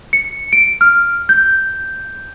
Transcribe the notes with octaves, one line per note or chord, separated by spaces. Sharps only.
C#7
D7
F6
G6